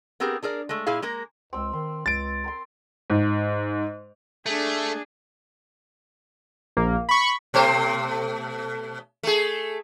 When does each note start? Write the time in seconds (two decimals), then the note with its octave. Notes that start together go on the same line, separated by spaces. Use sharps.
0.20 B3 C4 G4 G#4 A#4
0.43 D4 G#4 A#4 D5
0.69 G#3 A3
0.86 A#2 E4 G#4 F5
1.02 G#3 A#3 A#4
1.53 C#2 C4 E6
1.73 D#3 C6
2.06 C#2 A6 D7
2.44 A#4 G5 C6
3.10 G#2
4.46 A3 D4 G#4
6.77 A#1 A#3
7.09 B5 C#6
7.54 B2 A3 C5
9.23 A3 G#4